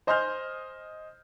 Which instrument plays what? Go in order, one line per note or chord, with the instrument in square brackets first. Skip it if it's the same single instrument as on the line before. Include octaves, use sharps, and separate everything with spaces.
[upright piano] C5 D#5 G#5 C6 F6 G6